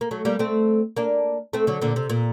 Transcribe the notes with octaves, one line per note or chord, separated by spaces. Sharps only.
A#3
F#3 A3
G3 A#3
A3 C4
A#3 D4
A3 C4
D3 F#3
A#2 D3
C3
A#2